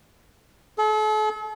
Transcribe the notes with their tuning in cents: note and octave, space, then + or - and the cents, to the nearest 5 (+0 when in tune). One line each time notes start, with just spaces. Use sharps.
A4 -40